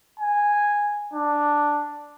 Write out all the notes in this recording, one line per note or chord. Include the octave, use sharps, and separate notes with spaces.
G#5
D4